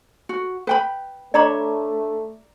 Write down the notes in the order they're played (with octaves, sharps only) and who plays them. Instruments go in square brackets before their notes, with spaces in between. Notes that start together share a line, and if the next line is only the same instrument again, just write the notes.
[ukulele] F#4
B4 G5 B5
[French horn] A3 [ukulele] D4 C#5 B5 [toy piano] D5 A#5 D6